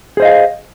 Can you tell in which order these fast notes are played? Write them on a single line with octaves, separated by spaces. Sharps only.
G#4 C5 D#5 F5